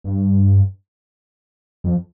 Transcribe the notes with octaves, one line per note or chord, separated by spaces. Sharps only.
G2
F2